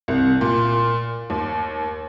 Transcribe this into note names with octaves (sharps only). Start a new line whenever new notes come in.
C2
A#2
D#2